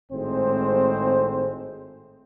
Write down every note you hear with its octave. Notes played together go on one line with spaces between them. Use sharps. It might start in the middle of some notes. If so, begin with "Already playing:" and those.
G#1 A2 G#3 C4 C5